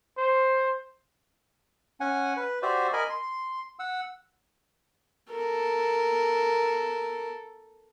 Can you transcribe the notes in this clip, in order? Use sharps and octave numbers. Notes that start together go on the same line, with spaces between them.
C5
C#4 F#5 G#5
B4
F#4 G4 C5 D5 E5
A#4 D#5 G#5 B5
C6
F#5 E6
A4 A#4